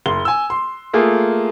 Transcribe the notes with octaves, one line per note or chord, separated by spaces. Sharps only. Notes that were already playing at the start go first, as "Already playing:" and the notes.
F#1 C6 G7
G#5 E6
C6
A3 A#3 F4 G#4